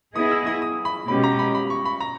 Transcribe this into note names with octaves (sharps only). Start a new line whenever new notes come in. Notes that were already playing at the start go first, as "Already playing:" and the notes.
B3 E4 G#4 D#5 D#6
E6
D#6
D#6
B5
B2 G#3 C#4 G4 B5
A#5
B5
B5
C#6
B5
A#5